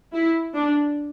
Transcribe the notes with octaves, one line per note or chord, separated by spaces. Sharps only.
E4
D4